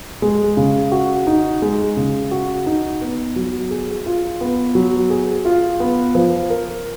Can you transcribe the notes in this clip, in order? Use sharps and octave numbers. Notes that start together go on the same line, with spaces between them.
G#3
C#3
F#4
D#4
G#3
C#3
F#4
D#4
B3
F#3
G#4
F4
B3
F#3
G#4
F4
B3
F3
A#4